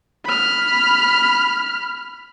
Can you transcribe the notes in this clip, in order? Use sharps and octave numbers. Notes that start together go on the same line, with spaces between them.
B5 F6